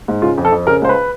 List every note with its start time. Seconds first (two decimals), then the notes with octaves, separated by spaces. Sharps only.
0.08 G#2
0.22 C#3 F4
0.38 F2
0.45 A4
0.52 F2
0.67 C#3 A#4
0.82 C#2 C5
0.89 B4